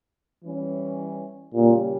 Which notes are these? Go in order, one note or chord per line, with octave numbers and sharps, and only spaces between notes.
E3 G3 C#4 E4
A#2 C#3 G3 C#4 G4